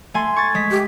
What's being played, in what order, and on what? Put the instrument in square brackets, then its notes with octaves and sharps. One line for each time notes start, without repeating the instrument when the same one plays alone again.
[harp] A3 G#5 C6
C#6 G#6 A6
G#3 B6
[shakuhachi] G4